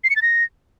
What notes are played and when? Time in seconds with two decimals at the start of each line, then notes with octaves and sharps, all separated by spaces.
0.04 C7
0.10 C#7
0.16 A6
0.22 A#6